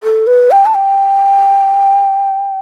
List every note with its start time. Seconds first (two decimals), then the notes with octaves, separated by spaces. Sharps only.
0.03 A4
0.27 B4
0.51 G5
0.66 A5
0.74 G5